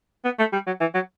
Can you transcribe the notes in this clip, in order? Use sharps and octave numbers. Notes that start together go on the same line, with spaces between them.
B3
A3
G3
F#3
E3
F#3